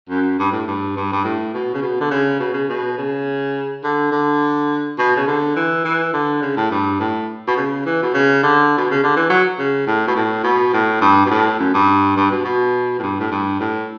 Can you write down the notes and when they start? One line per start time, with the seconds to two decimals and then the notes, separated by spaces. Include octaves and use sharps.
0.10 F#2
0.39 G2
0.52 A2
0.68 G2
0.97 G2
1.13 G2
1.24 A2
1.54 B2
1.74 C#3
1.82 B2
2.01 D3
2.11 C#3
2.40 B2
2.54 C#3
2.69 B2
2.98 C#3
3.84 D3
4.12 D3
4.99 B2
5.17 C#3
5.27 D3
5.56 E3
5.85 E3
6.13 D3
6.42 C#3
6.57 A2
6.71 G2
7.00 A2
7.48 B2
7.57 C#3
7.86 E3
8.03 B2
8.14 C#3
8.43 D3
8.78 B2
8.90 C#3
9.03 D3
9.16 E3
9.30 F#3
9.59 C#3
9.87 A2
10.07 B2
10.16 A2
10.44 B2
10.74 A2
11.01 G2
11.26 B2
11.31 A2
11.59 F#2
11.74 G2
12.17 G2
12.31 B2
12.45 B2
12.99 A2
13.02 G2
13.20 A2
13.31 G2
13.60 A2